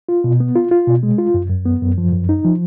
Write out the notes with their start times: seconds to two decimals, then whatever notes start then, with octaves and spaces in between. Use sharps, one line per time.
0.09 F4
0.24 B2
0.40 B3
0.56 F4
0.71 F4
0.87 B2
1.03 G#3
1.18 F4
1.34 F#2
1.50 F#2
1.66 B3
1.82 F#2
1.98 F3
2.13 F#2
2.29 D#4
2.45 F3